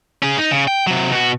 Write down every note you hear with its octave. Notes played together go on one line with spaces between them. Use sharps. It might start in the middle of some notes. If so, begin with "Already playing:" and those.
C#4 G#4
D#4
C#3
G5
C3 F#3
B2 F#4